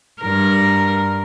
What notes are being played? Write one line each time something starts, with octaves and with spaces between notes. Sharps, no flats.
G2 A#4